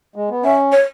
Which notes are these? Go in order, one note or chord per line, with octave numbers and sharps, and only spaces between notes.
G#3
B3
C#4 E5
C#5